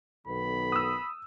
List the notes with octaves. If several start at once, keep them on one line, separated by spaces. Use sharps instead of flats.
B1 D#3 B3 A4 B5
D#6 E6